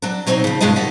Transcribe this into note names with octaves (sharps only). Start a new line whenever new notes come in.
F#3 D4
B2 F#3 C4 C#4 D#4
C#3 F3
G2 B2 G#3 D4 F4 D#5
D#2 G4 D5 D#5 F#5